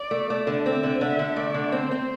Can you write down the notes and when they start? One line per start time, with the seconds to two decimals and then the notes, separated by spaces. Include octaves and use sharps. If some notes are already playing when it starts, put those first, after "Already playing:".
Already playing: D5
0.11 A3
0.30 A3
0.47 D3
0.65 C4 E5
0.83 D3
1.01 D3
1.19 D3
1.36 A3 D5
1.54 D3
1.72 C4 C5
1.91 C4